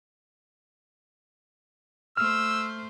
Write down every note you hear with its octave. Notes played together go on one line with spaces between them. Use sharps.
A3 C5 E6 F6